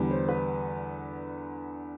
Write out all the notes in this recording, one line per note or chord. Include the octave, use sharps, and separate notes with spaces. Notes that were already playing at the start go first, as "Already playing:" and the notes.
Already playing: E2 D3 G3 B3
C5
B4